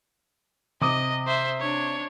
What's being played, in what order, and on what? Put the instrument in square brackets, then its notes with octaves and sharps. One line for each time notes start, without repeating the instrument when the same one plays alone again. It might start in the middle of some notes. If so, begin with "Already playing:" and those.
[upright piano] C3 D6 D#6 [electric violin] D#5
[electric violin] C5 E5
D4 C#5